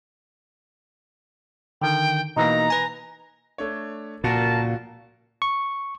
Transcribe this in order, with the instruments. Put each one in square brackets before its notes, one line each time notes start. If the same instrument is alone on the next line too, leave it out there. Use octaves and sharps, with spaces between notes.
[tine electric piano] D3 D#3 [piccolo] G5
[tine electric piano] B2 E3 A#3 [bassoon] D#4 [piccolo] A#5
[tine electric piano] B4 G#5
[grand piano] A3 D4 C#5
[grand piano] C#2 F3 F#4 [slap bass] A#2 [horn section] A#4 A5
[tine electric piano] C#6